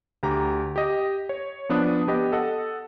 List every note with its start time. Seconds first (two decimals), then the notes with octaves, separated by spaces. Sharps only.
0.23 D2 G4 A#5
0.76 G4 D#5
1.29 C#5
1.69 F3 B3 D4 B4 D#6
2.08 B3 G4 D#5
2.32 A4 D#5 F#5